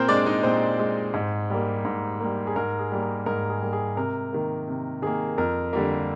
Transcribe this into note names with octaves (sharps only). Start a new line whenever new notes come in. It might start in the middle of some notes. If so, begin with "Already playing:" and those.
Already playing: A#2 C4 A#4 C5
G#3 D4 D5
D#4 D#5
A#2 C4 C5
G#3
G#2
G3 A#3
G#2
G3 A#3
G#4
G#2 A#4
G#4
G3 A#3
A#4
G#2 A#4
G#4
G3 A#3
G#4
C3 A#4
D#3 A#3
C3
D#3 A#3 G#4
F2 A#4
D3 G3 A#3